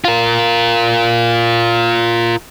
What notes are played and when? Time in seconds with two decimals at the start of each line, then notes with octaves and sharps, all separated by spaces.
0.05 F4 A#4